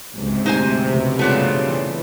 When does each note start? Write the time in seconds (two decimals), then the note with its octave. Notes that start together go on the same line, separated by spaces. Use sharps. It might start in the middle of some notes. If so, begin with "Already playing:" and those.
0.15 F#1 C#2 G#2 C3
0.46 A1 D2 E3 D#4 C5 G#5
0.88 F1 C#2 B2
1.19 G2 C#3 A3 B3 D4 F4
1.65 E3